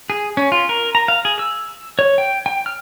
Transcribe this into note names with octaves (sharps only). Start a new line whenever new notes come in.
G#4
C#4
F4
A#4
A#5
F5
G#4
E6
C#5
G5
G5
F6